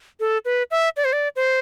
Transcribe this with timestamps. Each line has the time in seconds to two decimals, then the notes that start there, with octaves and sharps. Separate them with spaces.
0.20 A4
0.45 B4
0.71 E5
0.97 D5
1.05 C5
1.13 D5
1.36 C5